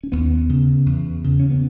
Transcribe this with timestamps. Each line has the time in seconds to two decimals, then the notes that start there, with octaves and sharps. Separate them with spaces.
0.03 C#4
0.12 D#2 B3
0.49 C#3
0.86 E2
1.24 C#3
1.40 C#4
1.50 B3